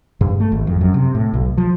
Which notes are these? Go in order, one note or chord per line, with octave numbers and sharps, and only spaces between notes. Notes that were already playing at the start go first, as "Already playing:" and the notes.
G2
A3
G#1
F2
F#2
C3
A2
B1
F3